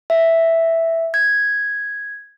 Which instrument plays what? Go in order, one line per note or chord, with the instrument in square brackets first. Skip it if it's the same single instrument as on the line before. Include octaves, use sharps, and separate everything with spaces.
[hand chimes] E5
G#6